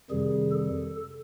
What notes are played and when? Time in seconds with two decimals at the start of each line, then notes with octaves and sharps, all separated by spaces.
0.11 F2 C3 D#3 G3 G#4
0.52 A4